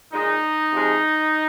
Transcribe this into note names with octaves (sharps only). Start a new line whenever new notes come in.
A#2 G#3 D#4
C3 F3 G#3